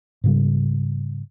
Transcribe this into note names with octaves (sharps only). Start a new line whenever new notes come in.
G#2 C#3 G3